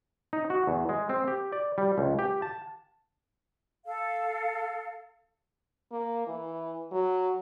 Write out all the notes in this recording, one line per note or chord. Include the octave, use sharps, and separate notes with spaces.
D#4
F#4
E2
G#3
C4
G4
D5
G3
C#2
G4
A5
A4 F5
A#3
E3
F#3